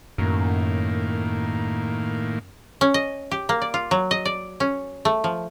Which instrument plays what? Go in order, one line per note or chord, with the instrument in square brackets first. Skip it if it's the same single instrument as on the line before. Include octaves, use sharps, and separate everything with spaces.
[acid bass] F#2 [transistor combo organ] A2 D#3 A#3
[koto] C#4
D#5
G4
A#3
D5
F4
F#3
D#5
D5
C#4
A3
F3